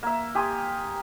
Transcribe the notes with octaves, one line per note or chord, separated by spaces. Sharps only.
A#3 E5
G4 G#5 C6 D#6